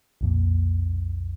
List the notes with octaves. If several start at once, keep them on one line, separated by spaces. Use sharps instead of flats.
B1 F2 A#2